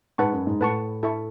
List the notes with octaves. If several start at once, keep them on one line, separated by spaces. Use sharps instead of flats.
G#2 B4 F#5 A5 C#6
F#2
G#2
A2 B4 F#5 A5 C#6
E4 A4 E5 A5 C#6